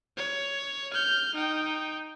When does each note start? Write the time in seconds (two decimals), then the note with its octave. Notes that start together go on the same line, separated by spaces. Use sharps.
0.17 C#5
0.93 F6 G6
1.35 D#4 G5